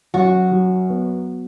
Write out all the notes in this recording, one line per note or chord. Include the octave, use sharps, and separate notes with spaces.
F#2 F#4
F#3
B3